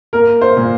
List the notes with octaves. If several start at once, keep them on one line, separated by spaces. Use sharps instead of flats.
A#3 A#4
C5
A#2